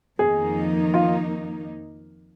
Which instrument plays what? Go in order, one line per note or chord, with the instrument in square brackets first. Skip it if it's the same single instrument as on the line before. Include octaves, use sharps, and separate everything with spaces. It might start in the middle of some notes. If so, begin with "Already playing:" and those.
[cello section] F2 D#3 A#3 D#4 [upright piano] G#4
[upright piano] F4